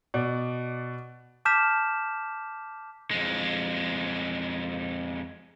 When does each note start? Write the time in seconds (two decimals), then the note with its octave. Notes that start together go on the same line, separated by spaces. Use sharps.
0.14 B2 D5
1.45 A5 D6 F6 G6 B6 E7
3.11 F2 G#3